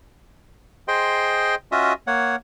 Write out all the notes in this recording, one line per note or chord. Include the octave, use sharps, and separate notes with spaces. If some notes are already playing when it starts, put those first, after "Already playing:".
G#4 C5 D#5 G5 C6
C#4 F4 F#4 D#5 E5 D#6
A#3 C#5 F#5